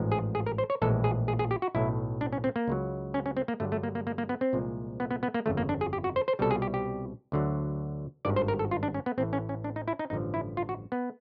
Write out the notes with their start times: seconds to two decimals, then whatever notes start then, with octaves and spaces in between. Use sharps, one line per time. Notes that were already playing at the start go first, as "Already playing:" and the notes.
Already playing: A1 G#2 F3 G#3
0.12 G#4
0.35 G#4
0.46 A#4
0.58 C5
0.70 C#5
0.82 A#1 A2 E3 G#3 A4
1.04 G#4
1.28 G#4
1.39 G#4
1.51 G4
1.62 F#4
1.75 B1 A2 F#3 E4
2.21 D4
2.33 C#4
2.44 C4
2.56 A#3
2.68 C#2 C#3 F#3
3.14 C#4
3.26 C#4
3.37 C4
3.48 A#3
3.60 G2 D3 F#3 A3
3.72 A3
3.83 A#3
3.95 A#3
4.07 A#3
4.18 A#3
4.29 B3
4.41 C4
4.53 C2 A#2 F3 G#3
5.00 B3
5.11 B3
5.23 B3
5.34 A#3
5.46 G1 F2 C#3 A3
5.57 A#3
5.69 D4
5.81 G#4
5.93 G4
6.04 F#4
6.16 C5
6.28 C5
6.39 C2 B2 G3 A4
6.51 G#4
6.62 G4
6.74 G4
7.32 D2 D3 F#3
8.25 G#1 G2 D#3 D5
8.36 C5
8.48 A#4
8.59 A4
8.71 F4
8.83 D4
8.94 C#4
9.06 B3
9.18 A1 A2 E3 C4
9.33 C#4
9.49 C#4
9.64 D4
9.76 D#4
9.88 E4
9.99 D#4
10.10 A1 G2 D3 F3 D#4
10.34 E4
10.57 F4
10.69 F#4
10.92 B3